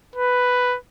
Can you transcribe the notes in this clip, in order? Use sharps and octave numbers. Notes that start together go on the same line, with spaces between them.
B4